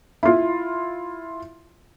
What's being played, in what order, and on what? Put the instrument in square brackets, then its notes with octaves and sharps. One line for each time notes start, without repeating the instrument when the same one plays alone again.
[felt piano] E4 F4